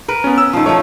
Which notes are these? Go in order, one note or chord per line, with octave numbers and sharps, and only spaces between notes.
A#4 B4
B3 C#4
E6
D#3 F3
F3 A3 C#5